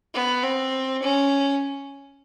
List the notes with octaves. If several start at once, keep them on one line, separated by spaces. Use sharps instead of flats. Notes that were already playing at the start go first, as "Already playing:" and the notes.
B3
C4
C#4